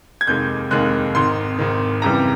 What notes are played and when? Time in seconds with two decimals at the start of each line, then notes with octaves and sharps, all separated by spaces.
0.21 G#6
0.27 F1 D#2 D#3 G#3 G6
0.71 F1 D#2 D#3 G#3 F#6
1.15 G#1 G#2 D#3 C6
1.59 G#1 G#2 D#3
2.02 F#1 F2 C#3 E3 G3 A#5